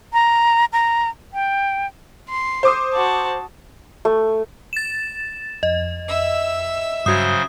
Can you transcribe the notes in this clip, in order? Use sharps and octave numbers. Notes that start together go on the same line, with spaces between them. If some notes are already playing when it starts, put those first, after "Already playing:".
A#5
A#5
G5
C6
C5 D6 D#6
F#4 A5
A3
A6 E7
F2 D#5
E5 E6
G2 C#3 F#3 F#4 C5 D#6 G#6